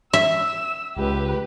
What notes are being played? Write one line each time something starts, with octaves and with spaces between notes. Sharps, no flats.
E5 E6
C#2 G4 B4